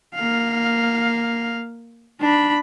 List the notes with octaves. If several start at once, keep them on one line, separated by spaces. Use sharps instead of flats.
A#3 F5
D4 B5